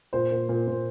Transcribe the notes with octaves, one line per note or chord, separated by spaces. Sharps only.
A#2 C5
A#2
A#2
A#2